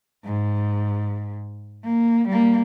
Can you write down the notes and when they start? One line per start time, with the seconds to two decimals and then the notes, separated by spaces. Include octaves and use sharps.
0.25 G#2
1.84 A#3
2.28 G3 A#3